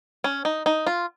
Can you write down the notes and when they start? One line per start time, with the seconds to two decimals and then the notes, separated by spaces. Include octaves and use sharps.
0.24 C#4
0.45 D#4
0.66 D#4
0.87 F4